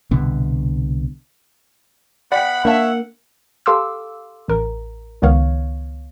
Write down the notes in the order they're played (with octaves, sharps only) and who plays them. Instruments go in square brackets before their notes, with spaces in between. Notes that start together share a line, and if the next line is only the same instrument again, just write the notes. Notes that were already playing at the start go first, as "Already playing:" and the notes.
[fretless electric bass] C2 B2 D3 B3
[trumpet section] B3 B5 [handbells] D5 G5 [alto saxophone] F#5
[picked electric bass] A#3 [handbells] D4 F5 A5 [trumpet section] C#5 E5
[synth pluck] G4 A4 F5 C6 D6 E6
A1 A#4
C#2 D#3 B3 C#5 F5